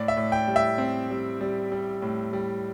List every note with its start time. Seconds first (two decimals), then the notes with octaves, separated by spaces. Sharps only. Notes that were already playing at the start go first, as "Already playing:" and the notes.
Already playing: A2 D5
0.08 E5
0.17 A2
0.32 G5
0.48 G3
0.56 E5
0.78 C4
1.10 G3
1.41 G3
1.72 G3
2.02 A2
2.33 G3